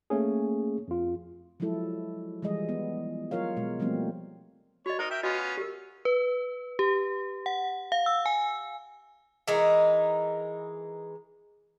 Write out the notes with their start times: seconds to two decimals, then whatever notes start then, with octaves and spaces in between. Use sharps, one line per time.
0.10 A3 A#3 C#4 G#4
0.88 F2 F4
1.60 F3 F#3 G#3 E4 A4
2.42 E3 F3 G3 G#3 G#4 D#5
2.69 B3
3.31 F#3 F4 A#4 C#5 F5
3.57 B2 G#3
3.80 F3 G3 A3 A#3 C4
4.86 F#4 C#5 D#5
4.99 D#4 A#4 C5
5.11 A#4 E5 G5
5.23 B3 C#4 F4 F#4 D#5
5.57 G4 A#4
6.05 B4
6.79 G4
7.46 F#5
7.92 F5
8.06 E6
8.26 G#5
9.48 E3 G#3 D#4 A#4